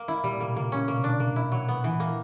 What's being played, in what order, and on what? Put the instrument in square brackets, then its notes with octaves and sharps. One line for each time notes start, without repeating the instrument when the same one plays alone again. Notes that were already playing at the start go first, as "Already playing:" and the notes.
Already playing: [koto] A#3
E4
[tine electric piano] A#2 [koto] G3
[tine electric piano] A#2
[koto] A#3
[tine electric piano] B2
[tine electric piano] A#2 C#3 [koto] A#3
[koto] C#4
[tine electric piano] B2 D3 [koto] A#3
[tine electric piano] B2 D3
[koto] D4
[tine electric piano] A#2 C#3
[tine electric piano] B2 [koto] A#3
[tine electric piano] A#2
[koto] E4
[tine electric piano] B2
[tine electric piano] A#2 [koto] F#3
[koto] B3
[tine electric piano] A#2 [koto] E3
[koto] A#3